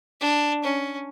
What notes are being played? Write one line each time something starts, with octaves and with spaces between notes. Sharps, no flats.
D4
C#4